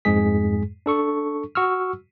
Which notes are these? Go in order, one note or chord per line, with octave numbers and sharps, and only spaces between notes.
F2 G#2 G#3 G#4 B6
D4 A4 C#6
F#4 C#6 E6 F6